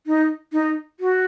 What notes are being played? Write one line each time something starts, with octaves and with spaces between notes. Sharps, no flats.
D#4
D#4
F#4